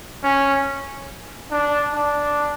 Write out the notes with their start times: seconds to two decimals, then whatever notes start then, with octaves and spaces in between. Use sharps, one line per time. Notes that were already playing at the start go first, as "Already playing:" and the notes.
0.24 C#4
1.51 D4
1.94 D4